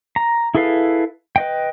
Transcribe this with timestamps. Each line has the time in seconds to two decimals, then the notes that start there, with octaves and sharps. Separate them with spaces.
0.16 A#5
0.55 E4 G#4 A4 B4 F5
1.36 B4 D#5 G5